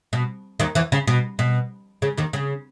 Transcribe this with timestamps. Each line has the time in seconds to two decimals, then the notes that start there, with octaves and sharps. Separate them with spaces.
0.13 B2
0.60 D#2 D#3
0.75 E2 E3
0.92 C#3
1.07 B2
1.39 B2
2.02 C#3
2.17 D#2 D#3
2.33 C#3